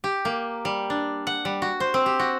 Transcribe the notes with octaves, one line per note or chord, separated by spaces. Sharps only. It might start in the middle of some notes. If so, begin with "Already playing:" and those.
G4
A#3
G3
D4
F#5
G3
F#4
C5
C4
G4
F#4